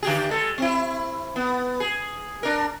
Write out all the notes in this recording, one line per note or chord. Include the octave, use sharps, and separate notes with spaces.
D3 G4 G#4
G#3 A4
C4 E4
B3
G#4
D4 A#4